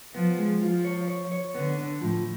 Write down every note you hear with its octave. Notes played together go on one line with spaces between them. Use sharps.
F3 B3
G#3
F3 F4
C#5
C#5
C#5
D3 B3
D4
A2 F3